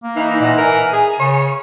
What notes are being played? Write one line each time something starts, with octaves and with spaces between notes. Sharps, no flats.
A#3
E3 D#4
A#2 D#5 F#5
A#4 G#5
G#4
C#3 C#5